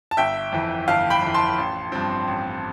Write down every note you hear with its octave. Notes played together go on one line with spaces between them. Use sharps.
A5
G1 E5 G5
F2 E3
G1 F5 A5
G5 B5
F2 E3
A5 C6
A1
G2 F3 C4
A1